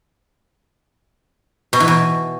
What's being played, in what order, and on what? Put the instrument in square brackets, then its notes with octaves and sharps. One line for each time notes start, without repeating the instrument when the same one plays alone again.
[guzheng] B2
E3
B2